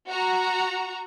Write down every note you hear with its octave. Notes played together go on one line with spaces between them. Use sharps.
F#4 A#5